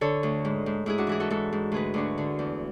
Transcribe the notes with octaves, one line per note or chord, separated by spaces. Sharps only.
D3 A4 C#5
D2
G#2
G#2
G#2 E4 G#4
D4 F#4
E3 E4 G#4
F#4 A4
G#2 F#4 A4
G#2
D2 G#4 B4
D2 D4 F#4
D3
E2